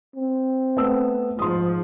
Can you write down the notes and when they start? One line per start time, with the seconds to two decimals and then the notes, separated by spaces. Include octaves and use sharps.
0.16 C4
0.77 A3 B3 E6
1.39 G#2 F3 C6 D#6